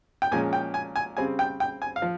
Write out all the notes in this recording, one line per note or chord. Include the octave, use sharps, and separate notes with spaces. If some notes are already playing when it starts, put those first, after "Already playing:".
G5
A#2 F3 G#3 C#4 G#5
G5
G#5
G#5
C#3 G3 C4 G#5
G5
G5
G#5
F5
F3